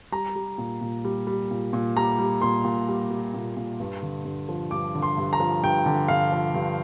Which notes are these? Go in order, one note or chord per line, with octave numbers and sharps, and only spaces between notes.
G3 A#5
G3
A#2
A#2
G3
G3
A#2
A#2
G3 A#5
G3
A#2 C6
A#2
G3
G3
A#2
A#2
G2
D3
G2
F3
G2 D6
D3
C6
G2
A#5
F3
G2 G5
D3
G2 F5
F3
G2